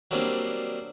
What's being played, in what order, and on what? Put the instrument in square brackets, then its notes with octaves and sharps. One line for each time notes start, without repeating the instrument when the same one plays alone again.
[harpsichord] F#3 G3 A#3 C4 D4